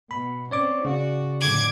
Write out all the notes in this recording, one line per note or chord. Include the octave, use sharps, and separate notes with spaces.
B2 B5
C4 C#4 C#5 D5 D6
C#3 F#4 D5
F2 A2 D3 D6 G#6